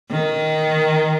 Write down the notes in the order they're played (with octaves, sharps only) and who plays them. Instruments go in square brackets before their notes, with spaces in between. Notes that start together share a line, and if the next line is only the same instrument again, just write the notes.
[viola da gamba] D#3